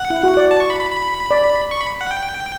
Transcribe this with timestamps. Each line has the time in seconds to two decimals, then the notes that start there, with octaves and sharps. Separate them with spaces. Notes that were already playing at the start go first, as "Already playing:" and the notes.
Already playing: F#5
0.10 E4
0.23 F#4
0.37 D5
0.51 A5
0.60 C#6
0.70 B5
0.80 B5
0.91 B5
1.31 D5
1.71 C#6
1.81 B5
2.01 F#5
2.11 G5